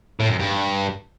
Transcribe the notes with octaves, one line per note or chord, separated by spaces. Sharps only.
A2
F#2
G2